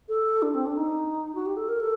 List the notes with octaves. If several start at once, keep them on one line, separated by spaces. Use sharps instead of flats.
A4
D4
C4
D4
D#4
F#4
G4
A4
A#4
A4